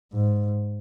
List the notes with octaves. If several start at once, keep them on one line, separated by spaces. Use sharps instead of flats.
G#2